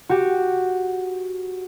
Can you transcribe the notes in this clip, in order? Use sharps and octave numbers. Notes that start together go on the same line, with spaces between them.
F#4 G4